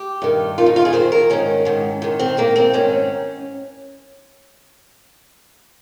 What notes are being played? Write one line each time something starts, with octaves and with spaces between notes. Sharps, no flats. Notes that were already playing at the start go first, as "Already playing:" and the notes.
Already playing: G4
G2 D#3
F2 D#3 F4
D#4
F4
G#4
F2 D#3 C5
A#4
G#2 D#3 C#4
G#2 D#3
G#2 D#3
C4
G#2 D#3 A#3
C4
G#2 D#3 C#4